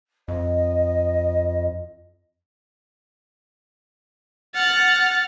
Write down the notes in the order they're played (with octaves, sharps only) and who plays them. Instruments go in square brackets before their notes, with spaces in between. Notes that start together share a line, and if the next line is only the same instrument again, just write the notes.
[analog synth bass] F2 [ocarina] D#5
[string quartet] F#5 [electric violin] F6 A6